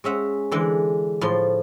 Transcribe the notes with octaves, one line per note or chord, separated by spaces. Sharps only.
G#3 C#4 E5 F#5
D3 E3 G#3
A2 F3 C6